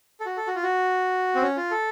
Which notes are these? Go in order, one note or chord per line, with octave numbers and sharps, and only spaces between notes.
A4
F#4
A4
F#4
F4
F#4
C4
C#4
F4
A4